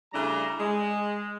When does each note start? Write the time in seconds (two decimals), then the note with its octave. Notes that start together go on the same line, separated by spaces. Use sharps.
0.13 C#3 G3 A3 D4 E4 A#5
0.58 G#3